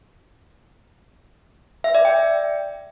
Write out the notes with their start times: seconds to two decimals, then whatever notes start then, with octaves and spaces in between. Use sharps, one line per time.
1.84 E5
1.95 D5
2.05 G5